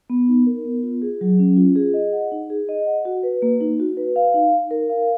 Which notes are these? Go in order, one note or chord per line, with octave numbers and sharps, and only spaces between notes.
B3
D#4
A#4
B3
F4
G#4
F#3
C#4
F4
G#4
D#5
F#5
D#4
G#4
D#5
F#5
F#4
B4
A#3
D#4
F#4
B4
F5
D#4
D#4
A#4
F5